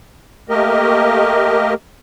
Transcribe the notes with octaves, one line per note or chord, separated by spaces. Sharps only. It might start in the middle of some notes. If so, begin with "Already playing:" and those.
A3 A#3 G4 A#4 D#5